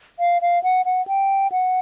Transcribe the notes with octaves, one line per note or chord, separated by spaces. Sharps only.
F5
F5
F#5
F#5
G5
F#5